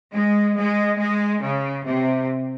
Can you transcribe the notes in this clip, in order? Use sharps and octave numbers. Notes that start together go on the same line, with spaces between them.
G#3
G#3
G#3
C#3
C3